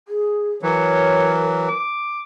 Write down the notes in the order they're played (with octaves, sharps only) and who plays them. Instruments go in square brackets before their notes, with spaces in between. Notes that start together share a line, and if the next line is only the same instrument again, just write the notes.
[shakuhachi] G#4
[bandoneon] E3 F#3 [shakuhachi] A#4 [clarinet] C#5
[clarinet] D6